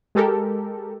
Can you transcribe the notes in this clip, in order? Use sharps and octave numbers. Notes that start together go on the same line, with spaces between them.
G#3 G4 A4 A#4